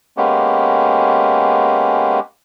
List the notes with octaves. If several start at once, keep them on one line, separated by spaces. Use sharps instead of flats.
G#3 A#3 B3 C#4 G4